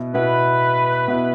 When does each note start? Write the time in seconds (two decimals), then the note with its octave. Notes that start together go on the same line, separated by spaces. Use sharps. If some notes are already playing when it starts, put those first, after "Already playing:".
Already playing: B2 B3 E4
0.14 B2 B3 E4 B4
1.08 B2 B3 E4